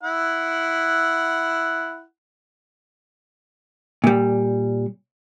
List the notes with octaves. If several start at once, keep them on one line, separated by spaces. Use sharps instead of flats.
E4 F#5
A#2 G3